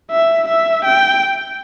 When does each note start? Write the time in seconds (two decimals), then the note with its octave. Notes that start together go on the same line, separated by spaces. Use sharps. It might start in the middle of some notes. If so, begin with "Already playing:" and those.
0.11 E5
0.48 E5
0.85 G5